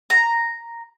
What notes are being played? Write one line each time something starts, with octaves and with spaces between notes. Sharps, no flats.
A#5